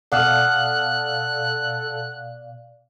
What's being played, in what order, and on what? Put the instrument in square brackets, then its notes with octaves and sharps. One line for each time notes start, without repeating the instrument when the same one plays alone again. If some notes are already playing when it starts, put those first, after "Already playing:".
[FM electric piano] B2 D5 F5 [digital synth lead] A4 [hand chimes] F#5 D#6 F6 [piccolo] F#6